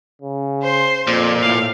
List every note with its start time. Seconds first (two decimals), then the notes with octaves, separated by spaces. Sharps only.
0.22 C#3
0.62 C5 C6
1.07 F2 A#2
1.42 A2 F5